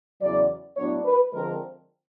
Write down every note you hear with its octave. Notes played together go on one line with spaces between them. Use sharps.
E2 C#3 F#3 D5
A2 F#3 B3 D4 C#5
B4
D3 F3 G#3 C4 A#4